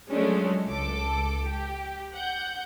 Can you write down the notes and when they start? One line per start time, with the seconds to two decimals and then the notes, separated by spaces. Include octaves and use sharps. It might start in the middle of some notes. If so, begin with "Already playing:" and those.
0.10 F3 F#3 G#3 A3 C#4 D4
0.69 C#2 A4 D6
1.48 G4
2.14 F#5 G6